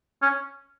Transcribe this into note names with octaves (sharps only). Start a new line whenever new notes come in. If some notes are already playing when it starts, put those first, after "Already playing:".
C#4